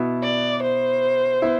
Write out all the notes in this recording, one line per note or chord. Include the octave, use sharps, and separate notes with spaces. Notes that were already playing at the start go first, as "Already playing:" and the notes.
Already playing: B2 B3 E4
D5
C5
B3 E4